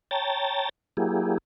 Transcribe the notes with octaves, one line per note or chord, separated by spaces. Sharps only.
C#5 G5 A5 A#5 A6
F#3 A#3 E4 G4 G#4